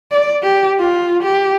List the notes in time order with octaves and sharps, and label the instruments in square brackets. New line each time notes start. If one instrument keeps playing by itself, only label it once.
[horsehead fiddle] D5
G4
F4
G4